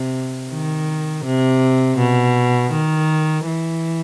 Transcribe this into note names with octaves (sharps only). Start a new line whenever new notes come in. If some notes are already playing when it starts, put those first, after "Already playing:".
Already playing: C3
D#3
C3
B2
D#3
E3